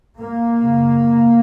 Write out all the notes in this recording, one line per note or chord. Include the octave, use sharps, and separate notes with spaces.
A#3
F#2 C#3